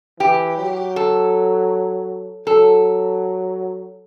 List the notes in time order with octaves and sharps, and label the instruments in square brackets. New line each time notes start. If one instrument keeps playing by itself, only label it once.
[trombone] E3 [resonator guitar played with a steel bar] G4
[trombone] F#3
[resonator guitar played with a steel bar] A4
[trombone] F#3 [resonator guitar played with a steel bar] A4